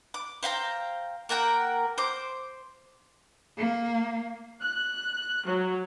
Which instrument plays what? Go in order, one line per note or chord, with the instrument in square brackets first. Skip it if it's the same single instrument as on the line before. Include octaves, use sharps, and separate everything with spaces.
[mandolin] D6
C5 F5 G5 A#5
A#3 A#4 F#5 G5
C5 D6
[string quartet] A#3
[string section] F#6
F#3